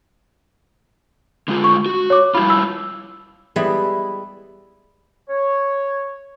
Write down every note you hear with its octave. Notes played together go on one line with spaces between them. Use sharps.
D3 G#3 F4
C#6
F#4
C#5 D6
G3 E4 F4 B5
E6
G3 G#3 B3 E4 E5
C#5